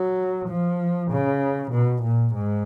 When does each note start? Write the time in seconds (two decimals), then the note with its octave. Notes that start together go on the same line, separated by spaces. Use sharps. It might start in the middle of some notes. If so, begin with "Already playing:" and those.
Already playing: F#3
0.49 F3
1.11 C#3
1.72 B2
2.03 A#2
2.34 G#2